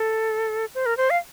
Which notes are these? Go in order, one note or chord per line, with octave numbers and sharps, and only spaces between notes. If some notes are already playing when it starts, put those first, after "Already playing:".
Already playing: A4
C5
A#4
C5
F5